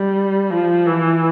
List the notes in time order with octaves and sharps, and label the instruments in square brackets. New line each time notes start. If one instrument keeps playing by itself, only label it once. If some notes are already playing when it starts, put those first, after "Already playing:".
Already playing: [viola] G3
F3
E3